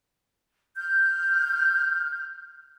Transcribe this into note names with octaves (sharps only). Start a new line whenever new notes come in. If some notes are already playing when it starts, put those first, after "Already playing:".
F6 G6